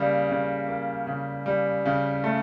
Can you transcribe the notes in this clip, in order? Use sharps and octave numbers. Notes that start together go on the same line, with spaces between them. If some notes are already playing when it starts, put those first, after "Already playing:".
Already playing: C#3 G3 A#3
C#3
A#3
C#3
G3
C#3
A3